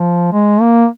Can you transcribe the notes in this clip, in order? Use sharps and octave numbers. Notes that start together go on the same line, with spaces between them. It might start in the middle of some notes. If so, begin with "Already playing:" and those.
Already playing: F3
G#3
A#3